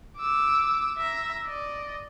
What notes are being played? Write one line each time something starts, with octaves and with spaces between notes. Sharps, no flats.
D6 E6
E5 A#5
D5 D#5